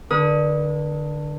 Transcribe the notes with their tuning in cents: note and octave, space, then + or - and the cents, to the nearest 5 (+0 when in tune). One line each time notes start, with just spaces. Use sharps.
D3 +15 B4 -40 D#6 +20